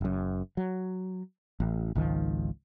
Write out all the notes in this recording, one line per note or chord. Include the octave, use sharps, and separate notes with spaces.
F#1 F#2
F#3
A1
G#1 C#2 D#3 F3